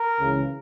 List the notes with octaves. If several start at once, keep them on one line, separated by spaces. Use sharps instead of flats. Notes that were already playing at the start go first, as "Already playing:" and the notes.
Already playing: A#4
C#2 C#3 E3